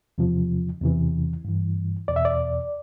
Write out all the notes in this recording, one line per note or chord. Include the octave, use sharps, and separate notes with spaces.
E2 C3 F3
E2 C3 E3
G2 E3
E2 B2 D5
E5
D5